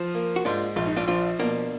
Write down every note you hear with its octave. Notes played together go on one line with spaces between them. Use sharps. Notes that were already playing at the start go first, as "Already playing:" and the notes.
Already playing: F3
A#3
F#4
G#2 D4 F4
A#1 F4
D#4
D4 F4
F3 D4 F4
B2 A#3 D4